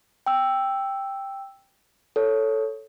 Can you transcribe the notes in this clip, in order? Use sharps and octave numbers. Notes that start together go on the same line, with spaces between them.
G5 E6
A4 C#5